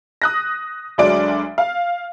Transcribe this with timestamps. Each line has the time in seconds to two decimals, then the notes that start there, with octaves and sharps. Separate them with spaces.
0.22 D#6 F#6 A#6
0.98 D2 F#3 G#3 D4 D5 D7
1.58 F5